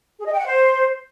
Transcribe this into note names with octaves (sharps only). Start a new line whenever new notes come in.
G#4
D#5
G5
F#5
C5